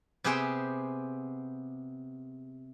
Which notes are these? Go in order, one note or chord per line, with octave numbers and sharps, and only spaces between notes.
C3 B3 G4 G#4 C5 G5